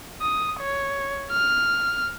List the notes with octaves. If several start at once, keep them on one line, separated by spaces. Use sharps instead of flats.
D#6
C#5
F6